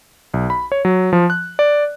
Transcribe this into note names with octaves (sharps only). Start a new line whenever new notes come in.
B1
B5
C#5
F#3
F3
F#6
D5